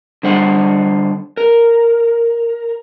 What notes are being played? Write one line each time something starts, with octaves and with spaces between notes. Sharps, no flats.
D3 G3 C5 F#5
A#4